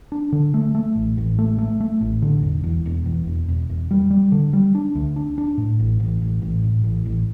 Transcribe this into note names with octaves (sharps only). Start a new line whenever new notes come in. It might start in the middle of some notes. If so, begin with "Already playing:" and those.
D4
D3
A3
A3
A1
A1
A3
A3
A3
A1
D3
E1
E2
E1
E2
E1
E1
E1
G3
G3
D3
G3
D4
D2
D4
D4
A2
A1
A1
A1
A1
A2
A1
A1